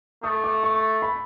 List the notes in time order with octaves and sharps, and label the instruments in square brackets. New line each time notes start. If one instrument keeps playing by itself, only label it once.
[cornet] A3 [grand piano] D#6
[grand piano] D6
C#6
B5